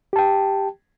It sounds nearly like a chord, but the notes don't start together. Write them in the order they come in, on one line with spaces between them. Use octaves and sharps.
G4 A5 G5